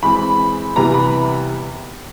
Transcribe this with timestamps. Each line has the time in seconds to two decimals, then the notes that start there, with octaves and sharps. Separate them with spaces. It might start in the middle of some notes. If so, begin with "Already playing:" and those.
0.03 E3 G#3 C4 B5
0.76 C3 E3 G3 B3 A#5
0.94 B5